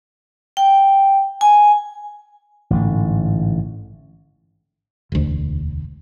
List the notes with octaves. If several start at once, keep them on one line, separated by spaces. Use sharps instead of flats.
G5
G#5
A1 G#2 D3
E1 D2